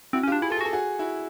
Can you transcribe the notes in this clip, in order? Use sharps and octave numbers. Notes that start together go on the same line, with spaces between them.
C4 E4 F#4
C#4
F4 G4
D4
E4 G#4
F4 A4
G#4
F#4
A4
F#4 G#4
E4 F#4